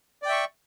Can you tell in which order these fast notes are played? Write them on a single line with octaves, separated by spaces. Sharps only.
D5 G5 E5 C#6